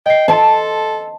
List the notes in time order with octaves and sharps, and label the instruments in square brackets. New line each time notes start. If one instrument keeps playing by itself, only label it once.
[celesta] D#5 C7 [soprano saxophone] G5
[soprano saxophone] A4 [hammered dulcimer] A5 C6